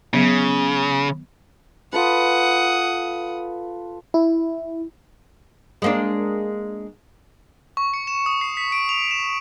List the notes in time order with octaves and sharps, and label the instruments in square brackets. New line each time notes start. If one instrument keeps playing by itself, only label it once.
[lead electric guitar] C#3 [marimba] F#3 B3
[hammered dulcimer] F4 A4 B4 [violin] F#5 D#6
[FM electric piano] E4
[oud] G#3 A#3 D4
[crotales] C#6
C#7
E7
D#6
C7
B6
D7
F7
E7